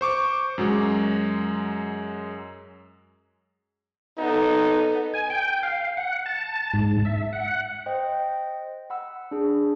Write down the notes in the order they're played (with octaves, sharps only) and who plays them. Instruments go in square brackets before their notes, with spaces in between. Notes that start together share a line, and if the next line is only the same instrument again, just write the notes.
[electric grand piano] C5 C#6 D6
F#2 F#3 G#3
[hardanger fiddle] B3 A4 [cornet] D#4
[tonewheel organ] G#5
G5
F5
F#5
A5
G#2
E5
F#5
[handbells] C5 D#5 G5
F#5 B5 E6
D4 G#4